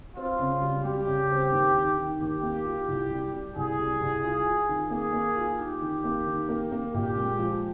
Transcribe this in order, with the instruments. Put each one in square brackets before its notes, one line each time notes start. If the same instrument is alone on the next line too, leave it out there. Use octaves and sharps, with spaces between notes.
[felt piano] C4 [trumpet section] F4
[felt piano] C#3
G3
[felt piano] G3 [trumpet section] G4
[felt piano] C#3
C4
D#2
D#3
D#3
[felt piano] D#2 [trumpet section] G4
[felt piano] A#3
F4
C2
G3
G3
[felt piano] C2 [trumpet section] G#4
[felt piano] G3
C2
F4
F4
D#3
[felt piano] A#3 [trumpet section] G#4
[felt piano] A#3
F4
[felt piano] D#4 [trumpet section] G4
[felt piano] D#3
A#3
D#3
A#3
A#3
[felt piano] A#2 [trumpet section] G4
[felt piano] G#3
F3